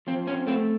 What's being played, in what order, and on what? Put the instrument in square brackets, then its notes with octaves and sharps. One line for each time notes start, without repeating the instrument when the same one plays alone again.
[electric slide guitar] F3 C4
C4 C#4
A3 C4